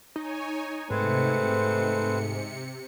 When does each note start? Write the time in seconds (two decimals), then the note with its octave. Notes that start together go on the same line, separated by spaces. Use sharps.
0.16 D#4 C#5 G#5
0.90 G#2 C3 A3 C4 B4 C5 C#7